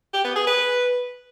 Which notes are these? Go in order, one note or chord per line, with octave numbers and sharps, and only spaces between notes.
G4
B3
G#4
B4